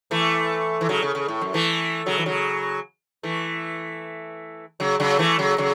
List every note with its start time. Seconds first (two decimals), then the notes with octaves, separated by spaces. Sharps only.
0.11 E3 A3
0.81 E3
0.89 C#3 F#3
1.02 C#3
1.15 C#3
1.28 A2
1.41 F#2
1.54 E3 A3
2.06 C#3 F#3
2.18 E3
2.26 C#3 F#3
3.23 E3 A3
4.80 C#3 F#3
5.00 C#3 F#3
5.19 E3 A3
5.39 C#3 F#3
5.58 C#3 F#3